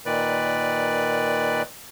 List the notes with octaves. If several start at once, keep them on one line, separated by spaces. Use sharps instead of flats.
A#2 D#3 B4 D5